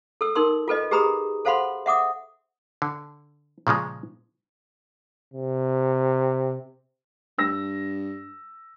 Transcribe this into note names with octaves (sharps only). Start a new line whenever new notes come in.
A4 E6
D#4 A#4 C6 E6
F4 A4 B4 D#5
G4 G#4 B4 A#5 B5 D#6
A4 C5 F5 F#5 B5 C6
E5 F#5 D6 D#6
D3
A#2 C#3 F3 G#3
C3
G2 E6 A#6